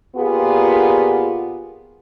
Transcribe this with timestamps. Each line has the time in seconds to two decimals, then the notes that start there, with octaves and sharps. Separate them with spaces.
0.16 A#2 B3 F4 G4 G#4